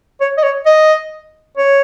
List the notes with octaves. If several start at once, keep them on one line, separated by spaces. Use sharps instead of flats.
C#5
D#5
C#5
D#5
C#5